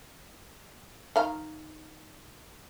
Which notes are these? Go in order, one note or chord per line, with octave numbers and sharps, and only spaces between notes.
D#3 F5 A#5